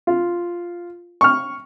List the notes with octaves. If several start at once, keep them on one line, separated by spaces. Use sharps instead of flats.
F4
C#6 F6